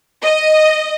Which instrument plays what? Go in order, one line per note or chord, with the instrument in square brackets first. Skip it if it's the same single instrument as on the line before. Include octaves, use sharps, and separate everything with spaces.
[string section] D#5